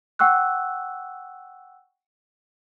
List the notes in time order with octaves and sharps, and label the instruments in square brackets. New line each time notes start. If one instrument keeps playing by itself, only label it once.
[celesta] F#5 G5 C#6 E6 F#6